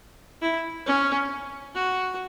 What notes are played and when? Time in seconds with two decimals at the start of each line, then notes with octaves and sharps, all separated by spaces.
0.42 E4
0.86 C#4
1.75 F#4